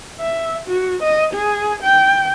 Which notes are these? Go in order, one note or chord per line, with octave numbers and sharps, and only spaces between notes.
E5
F#4
D#5
G#4
G5